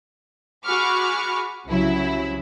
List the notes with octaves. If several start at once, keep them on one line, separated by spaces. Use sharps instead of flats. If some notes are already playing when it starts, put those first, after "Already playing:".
F#4 G#4 B5 C#6 D6 F6
C2 C#3 F#3 E4